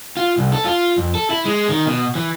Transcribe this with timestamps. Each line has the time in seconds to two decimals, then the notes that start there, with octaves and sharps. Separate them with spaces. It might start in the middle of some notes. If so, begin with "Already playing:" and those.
0.17 F4
0.38 C2
0.53 A4
0.65 F4
0.98 F2
1.15 A4
1.30 E4
1.45 G#3
1.69 D#3
1.86 B2
2.15 E3